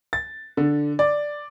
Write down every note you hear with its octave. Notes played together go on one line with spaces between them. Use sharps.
A6
D3
D5